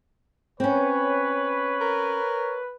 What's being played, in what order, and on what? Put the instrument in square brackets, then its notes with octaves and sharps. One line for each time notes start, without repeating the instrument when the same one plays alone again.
[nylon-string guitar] C4 C#4 [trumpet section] B4 [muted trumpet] C#5
[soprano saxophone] A#4